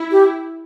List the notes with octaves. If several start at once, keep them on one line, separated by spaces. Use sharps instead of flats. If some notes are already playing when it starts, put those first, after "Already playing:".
Already playing: E4
G4